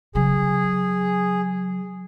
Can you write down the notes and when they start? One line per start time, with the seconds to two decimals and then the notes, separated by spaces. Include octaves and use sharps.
0.15 C#3 F#3 G#4